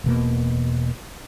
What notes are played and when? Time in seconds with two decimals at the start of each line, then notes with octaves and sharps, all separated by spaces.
0.04 E1 B2 A#3